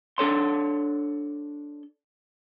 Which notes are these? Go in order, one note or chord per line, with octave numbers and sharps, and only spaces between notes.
D4 A4 C#5 C6